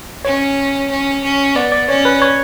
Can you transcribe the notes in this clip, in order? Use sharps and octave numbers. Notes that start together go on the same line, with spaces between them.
C#4 C#5
C#4
C#4
B3 D5
D5
C#4 C#5
B4
C#5